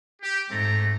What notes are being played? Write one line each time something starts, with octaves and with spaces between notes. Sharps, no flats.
G4
G#2 A3 C4 A#5